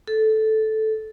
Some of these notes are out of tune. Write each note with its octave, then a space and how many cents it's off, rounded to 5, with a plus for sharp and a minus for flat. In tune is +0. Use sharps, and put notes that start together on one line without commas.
A4 -10